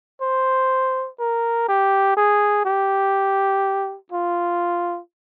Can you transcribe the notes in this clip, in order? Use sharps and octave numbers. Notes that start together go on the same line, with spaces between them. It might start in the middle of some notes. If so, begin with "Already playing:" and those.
C5
A#4
G4
G#4
G4
F4